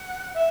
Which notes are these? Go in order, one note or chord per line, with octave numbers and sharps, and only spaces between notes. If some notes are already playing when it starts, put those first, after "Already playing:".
Already playing: F#5
E5